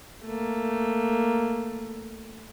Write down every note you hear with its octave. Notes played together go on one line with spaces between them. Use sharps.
A3 A#3